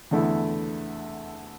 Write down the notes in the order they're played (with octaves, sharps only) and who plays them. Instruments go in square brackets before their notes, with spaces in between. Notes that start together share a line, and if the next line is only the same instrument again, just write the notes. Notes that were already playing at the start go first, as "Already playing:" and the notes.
[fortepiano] E2 D3 A3 E4